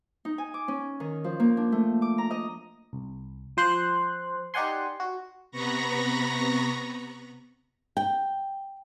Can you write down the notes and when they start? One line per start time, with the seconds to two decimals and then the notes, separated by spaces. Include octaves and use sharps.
0.25 D#4
0.38 G#5
0.54 D6
0.68 C#4
1.00 D#3
1.24 F3
1.40 A#3
1.57 D4
1.72 A3
2.02 D6
2.18 A#5
2.31 D#5
2.93 C2
3.57 F3 C5 C6 F#6
4.54 D#4 G4 D5 F#5 G#5 C6
5.00 F#4
5.51 C3 B3 A#5 B5 C#6 A#6
7.97 G5